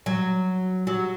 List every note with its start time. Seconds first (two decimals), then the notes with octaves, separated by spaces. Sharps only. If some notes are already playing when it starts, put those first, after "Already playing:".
0.06 F#3
0.87 F#3